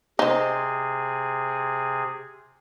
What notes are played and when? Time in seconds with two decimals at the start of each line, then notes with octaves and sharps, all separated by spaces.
0.19 C3 D#4 G#4 C5